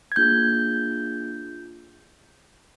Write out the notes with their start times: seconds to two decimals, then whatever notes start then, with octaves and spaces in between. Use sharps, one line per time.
0.12 G#6
0.16 A#3 D4 F4 G#4 G6